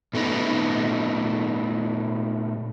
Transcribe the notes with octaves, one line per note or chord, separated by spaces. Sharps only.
A#2 A3 B3 D#4